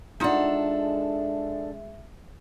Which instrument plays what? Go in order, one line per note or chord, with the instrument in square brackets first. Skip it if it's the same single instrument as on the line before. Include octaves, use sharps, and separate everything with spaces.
[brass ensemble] G#3 E5 [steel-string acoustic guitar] D4 A4 [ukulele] D#4 F4 F#5